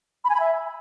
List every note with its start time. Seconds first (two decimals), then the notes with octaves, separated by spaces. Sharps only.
0.24 B5
0.29 G#5
0.35 B5
0.40 E5